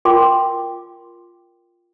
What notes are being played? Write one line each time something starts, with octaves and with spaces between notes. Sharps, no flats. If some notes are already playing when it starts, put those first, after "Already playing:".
F4 A#4 G5 C6 D6